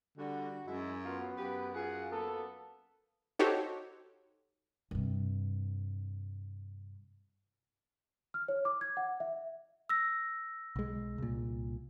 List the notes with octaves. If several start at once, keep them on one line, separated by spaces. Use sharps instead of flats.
D3 G3 F#4
F#2 G#3 E4
F#3 B3 F4
F#2 G4 B4
F4 G#4 F#5
A#3 B3 A4
D#4 F#4 G4 A4 C5 C#5
G2 C3
F6
C#5
D6
G#6
F#5
E5
E6 A#6
B1 G#3
C2 A#2